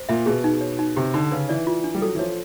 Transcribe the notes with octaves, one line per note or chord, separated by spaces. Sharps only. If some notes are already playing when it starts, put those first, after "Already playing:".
Already playing: C5
A#2 E5
B2 G#4
D#4
C#5
D#4
C3 G4
D3 D#4
C#3 B4
E3 D5
F4
D4
G3
F#3 A4
E3
F3 C#5